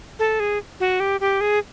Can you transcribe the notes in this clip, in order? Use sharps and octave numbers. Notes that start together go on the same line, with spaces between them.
A4
G#4
F#4
G4
G4
G#4